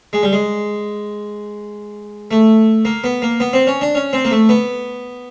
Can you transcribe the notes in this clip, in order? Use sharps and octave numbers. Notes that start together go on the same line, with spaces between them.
G#3
G3
G#3
A3
A#3
B3
A#3
B3
C4
C#4
D4
C#4
C4
A#3
A3
B3